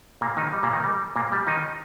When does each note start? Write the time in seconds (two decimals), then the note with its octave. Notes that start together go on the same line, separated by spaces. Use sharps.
0.21 A#2 A#3
0.37 D#3 D#4
0.53 G3
0.63 A#2 A#3
0.73 D#3 D#4
0.80 A#4
0.83 G3 G4
1.16 A#2 A#3
1.32 G3
1.47 D#3 D#4